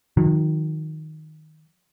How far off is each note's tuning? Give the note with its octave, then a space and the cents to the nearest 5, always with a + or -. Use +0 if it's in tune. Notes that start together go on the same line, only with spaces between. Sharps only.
D#3 +0 F#3 -45